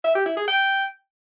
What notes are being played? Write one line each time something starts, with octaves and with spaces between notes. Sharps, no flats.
E5
G4
E4
G#4
G5